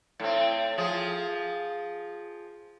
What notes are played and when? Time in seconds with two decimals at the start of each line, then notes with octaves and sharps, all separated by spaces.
0.20 A2 C4
0.78 F3 G#4